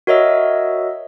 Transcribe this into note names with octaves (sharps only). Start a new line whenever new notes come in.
F#4 A#4 C#5 D#5 E5 E6